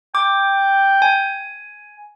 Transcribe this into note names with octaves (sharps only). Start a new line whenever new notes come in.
G5 D6
G#5